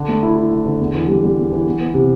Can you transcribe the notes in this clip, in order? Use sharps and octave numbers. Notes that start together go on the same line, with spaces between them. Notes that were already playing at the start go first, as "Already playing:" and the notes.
Already playing: D3
A3
E4
E4
E4
D3
E2
E3
G3
G3
E2
E3
B3
B3
C3